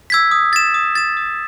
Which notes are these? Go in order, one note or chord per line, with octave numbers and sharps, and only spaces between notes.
E6 G#6 B6
D#6
A6 E7
D#6
A6 E7
D#6